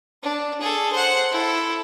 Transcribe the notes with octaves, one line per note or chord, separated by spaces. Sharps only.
D4
G#4 A4
C5 F#5
E4 A4